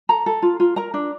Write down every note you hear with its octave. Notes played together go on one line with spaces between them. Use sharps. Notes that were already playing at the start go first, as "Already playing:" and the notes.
A4 A#5
A4
F4
F4
A#4 A#5
D4